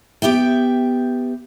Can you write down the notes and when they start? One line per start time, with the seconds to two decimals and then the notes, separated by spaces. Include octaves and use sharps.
0.22 B3 G4 E5 G5